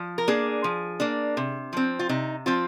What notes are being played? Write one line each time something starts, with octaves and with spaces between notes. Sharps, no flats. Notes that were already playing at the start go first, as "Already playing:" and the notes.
Already playing: F3
A#4
A#3 D4 G#4
F3
A#3 D4
C3
F3 C4
F4
C3 D#4
F3 C4 F4